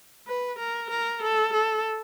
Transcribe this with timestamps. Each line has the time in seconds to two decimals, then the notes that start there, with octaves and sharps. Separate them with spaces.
0.27 B4
0.59 A#4
0.91 A#4
1.23 A4
1.54 A4